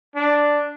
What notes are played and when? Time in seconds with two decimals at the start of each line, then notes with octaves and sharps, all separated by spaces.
0.16 D4